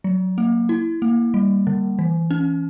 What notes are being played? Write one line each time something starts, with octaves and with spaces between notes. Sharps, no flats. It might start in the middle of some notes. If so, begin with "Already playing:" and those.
F#3
A#3
E4
A#3
G3
D3
E3
C#4